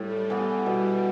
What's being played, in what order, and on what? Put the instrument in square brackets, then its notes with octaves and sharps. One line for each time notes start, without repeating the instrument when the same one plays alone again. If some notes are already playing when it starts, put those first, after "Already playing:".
Already playing: [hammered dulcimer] A2 [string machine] G3
[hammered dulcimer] E3 B3
[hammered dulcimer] B2 [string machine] G3